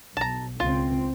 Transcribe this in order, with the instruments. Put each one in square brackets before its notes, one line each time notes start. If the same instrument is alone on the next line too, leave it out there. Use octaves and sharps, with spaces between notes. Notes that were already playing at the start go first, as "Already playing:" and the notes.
[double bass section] B1 [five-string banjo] A5 A#5
[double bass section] C#2 C4 [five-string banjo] F4